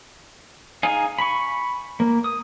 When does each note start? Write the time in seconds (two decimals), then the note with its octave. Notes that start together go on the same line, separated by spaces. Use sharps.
0.83 D#4 G#4 F5 G#5
1.19 B5 C#6
2.00 A#3
2.24 D#6